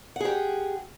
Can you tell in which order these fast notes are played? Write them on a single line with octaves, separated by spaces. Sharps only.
F#5 G#4 G4